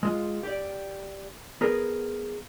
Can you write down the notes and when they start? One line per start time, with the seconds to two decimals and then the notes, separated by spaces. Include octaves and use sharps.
0.03 G#3 F4
0.43 G4 D5
1.61 B3 G#4 A#4 B4